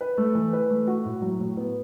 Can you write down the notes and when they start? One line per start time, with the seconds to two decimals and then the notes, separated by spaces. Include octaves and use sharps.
0.01 B4
0.18 A3
0.35 E3
0.53 B4
0.70 A3
0.87 F#4
1.05 A2
1.22 F#3
1.39 A2
1.57 B3